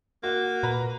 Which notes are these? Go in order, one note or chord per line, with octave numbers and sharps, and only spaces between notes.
A#3 F#4
A#2 B4 A#5 B5